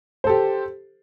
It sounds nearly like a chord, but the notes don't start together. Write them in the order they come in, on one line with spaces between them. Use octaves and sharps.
C5 A4 G4